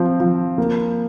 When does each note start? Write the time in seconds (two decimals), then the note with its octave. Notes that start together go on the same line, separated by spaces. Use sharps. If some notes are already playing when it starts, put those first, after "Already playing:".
Already playing: F3 C4
0.20 F3
0.58 A#3